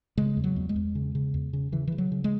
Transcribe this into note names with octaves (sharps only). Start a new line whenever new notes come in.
C#3 G#3
E2
F#3
E2
G#3
E2
C#3
C#3
E2
C#3
C#3 E3
C#3 E3
F#3
C#3
G#3